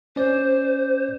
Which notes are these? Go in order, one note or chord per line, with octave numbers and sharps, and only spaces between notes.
C#4 C5 D5